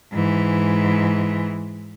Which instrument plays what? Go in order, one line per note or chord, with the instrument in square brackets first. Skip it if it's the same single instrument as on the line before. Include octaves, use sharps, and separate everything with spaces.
[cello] G#2 E3